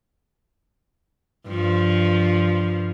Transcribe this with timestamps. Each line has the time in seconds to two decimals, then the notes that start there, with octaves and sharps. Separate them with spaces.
1.47 G2 F3